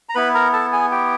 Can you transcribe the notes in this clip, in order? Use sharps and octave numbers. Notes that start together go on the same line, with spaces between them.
A#5
B3 E4 B4 B5
A#4 A#5
A4 A5
G#4 G#5
G4 G5